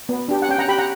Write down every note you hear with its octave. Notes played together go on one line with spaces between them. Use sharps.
B3
D4 G4
F#5
C#4 G5
F#5 A#5
G4 G5 B5
F#5 A#5